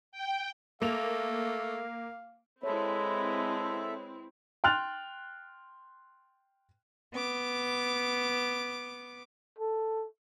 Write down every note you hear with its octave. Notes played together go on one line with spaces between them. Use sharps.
G5
A3 A#3 F5 F7
G#3 C4 E4 A4 B4 C#5 E5
G5 C6 F6 F#6 A6 F7
B3 D6
A4